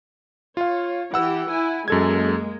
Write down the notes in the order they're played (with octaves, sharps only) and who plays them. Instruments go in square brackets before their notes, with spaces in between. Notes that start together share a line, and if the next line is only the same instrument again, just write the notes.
[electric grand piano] F4 F5 [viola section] C#5
[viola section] E3 G4 [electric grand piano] F#5 E6
[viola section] E4 G#5
[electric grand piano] F#2 A4 G#6 [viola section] G#3 A#3